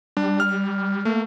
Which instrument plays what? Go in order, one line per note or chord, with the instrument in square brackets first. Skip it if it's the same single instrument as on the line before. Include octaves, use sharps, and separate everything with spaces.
[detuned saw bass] G3 [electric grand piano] D4
[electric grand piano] F6
[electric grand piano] A3 [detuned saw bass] A#3